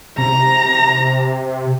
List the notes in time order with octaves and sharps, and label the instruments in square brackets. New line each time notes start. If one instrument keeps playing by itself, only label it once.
[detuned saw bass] C3 [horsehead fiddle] A#5